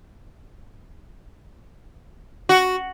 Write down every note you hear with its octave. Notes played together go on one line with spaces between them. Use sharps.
F#4